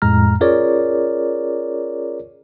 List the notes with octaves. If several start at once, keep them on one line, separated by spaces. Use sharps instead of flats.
F2 A2 G#3 A#5 F6
C#4 F4 G#4 A#4 C#5 D5